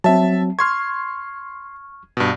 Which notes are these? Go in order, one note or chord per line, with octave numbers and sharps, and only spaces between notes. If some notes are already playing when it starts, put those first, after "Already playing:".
F#3 C4 E5 A5
C6 C#6 F6 G#6
G2 B2